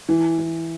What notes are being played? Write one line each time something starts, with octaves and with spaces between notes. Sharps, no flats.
E3
E3